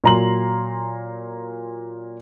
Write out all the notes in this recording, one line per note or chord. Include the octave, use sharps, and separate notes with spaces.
A#2 F#3 A#5 C6 F#7